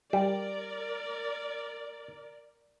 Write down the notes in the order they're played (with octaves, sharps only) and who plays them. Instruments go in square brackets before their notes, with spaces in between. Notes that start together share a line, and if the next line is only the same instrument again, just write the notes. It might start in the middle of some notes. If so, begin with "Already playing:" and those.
[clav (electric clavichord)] G3 [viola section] A#4 D5